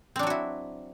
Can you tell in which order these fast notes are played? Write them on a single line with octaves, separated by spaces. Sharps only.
C4 D4 F#3 F#4 E4